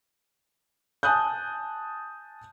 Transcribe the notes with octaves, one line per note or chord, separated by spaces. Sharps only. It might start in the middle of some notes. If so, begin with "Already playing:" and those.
G#5 A5 D#6 F#6 G6